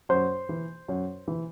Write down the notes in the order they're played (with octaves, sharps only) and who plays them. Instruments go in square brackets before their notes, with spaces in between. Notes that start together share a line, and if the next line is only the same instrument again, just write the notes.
[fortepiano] F#2 C5
E3
F#2
E3